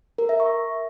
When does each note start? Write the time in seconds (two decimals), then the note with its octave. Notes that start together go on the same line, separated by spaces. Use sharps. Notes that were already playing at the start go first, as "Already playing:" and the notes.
0.18 A#4
0.29 E5
0.40 C#6